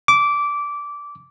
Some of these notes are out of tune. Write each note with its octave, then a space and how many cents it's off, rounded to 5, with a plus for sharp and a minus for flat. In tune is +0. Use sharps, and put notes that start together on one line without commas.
D6 -15